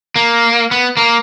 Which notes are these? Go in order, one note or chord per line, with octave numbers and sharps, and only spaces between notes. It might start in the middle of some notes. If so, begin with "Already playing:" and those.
A#3
B3
A#3